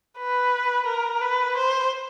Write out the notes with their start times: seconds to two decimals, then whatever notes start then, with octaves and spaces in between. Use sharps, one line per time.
0.18 B4
0.87 A#4
1.21 B4
1.57 C5